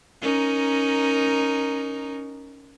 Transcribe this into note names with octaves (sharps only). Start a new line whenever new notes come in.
C#4 D#4 A#4